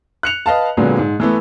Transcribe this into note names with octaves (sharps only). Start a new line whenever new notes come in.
F#6 C#7 F7
B4 D#5 F5 A5
A#2 D3 F#3 G#3 B3 C4
G#2
E3 A3 B3